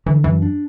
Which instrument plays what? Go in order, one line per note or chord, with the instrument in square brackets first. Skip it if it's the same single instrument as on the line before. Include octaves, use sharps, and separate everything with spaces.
[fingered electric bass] D3 [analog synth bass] E3
[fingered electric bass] F#2 [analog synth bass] E3
[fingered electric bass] D4